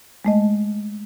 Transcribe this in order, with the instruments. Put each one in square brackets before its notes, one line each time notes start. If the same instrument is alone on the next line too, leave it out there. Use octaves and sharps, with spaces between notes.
[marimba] G#3 A3 D#5